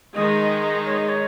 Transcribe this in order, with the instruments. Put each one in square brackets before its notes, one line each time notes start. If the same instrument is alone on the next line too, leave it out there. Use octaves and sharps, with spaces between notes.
[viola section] D#3 G#3 D#4 [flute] D#5
[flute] C#5
D#5
C#5